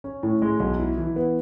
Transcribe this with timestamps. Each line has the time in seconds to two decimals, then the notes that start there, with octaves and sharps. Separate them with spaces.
0.04 C#4
0.23 A2
0.42 G#3
0.60 B1
0.79 E4
0.98 E3
1.16 B3